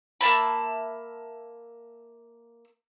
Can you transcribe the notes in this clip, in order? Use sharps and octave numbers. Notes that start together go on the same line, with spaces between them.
A#3 E5 A5 B5